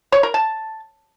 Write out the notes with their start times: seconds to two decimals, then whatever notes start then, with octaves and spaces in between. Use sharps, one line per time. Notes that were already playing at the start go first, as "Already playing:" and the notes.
0.12 C#5
0.23 A#4
0.34 A5